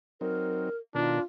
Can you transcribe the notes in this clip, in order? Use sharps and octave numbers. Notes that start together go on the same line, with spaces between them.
F#3 C4 D#4 A#4
B2 D#3 D4 F4 A#4